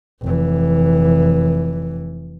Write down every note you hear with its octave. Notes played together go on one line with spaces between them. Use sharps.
F1 E3